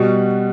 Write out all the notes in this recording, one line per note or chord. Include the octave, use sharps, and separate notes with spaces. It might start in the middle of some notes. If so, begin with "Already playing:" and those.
Already playing: B2 G3 F#4